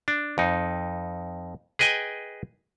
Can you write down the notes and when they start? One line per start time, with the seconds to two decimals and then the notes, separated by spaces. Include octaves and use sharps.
0.08 D4
0.38 F2 D#4
1.79 G#4 B4 D#5 G5 G#5